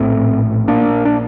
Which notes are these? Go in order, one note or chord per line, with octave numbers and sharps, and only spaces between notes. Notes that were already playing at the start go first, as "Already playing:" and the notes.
Already playing: A#1 A2 A3 C4
A#3 D4
D4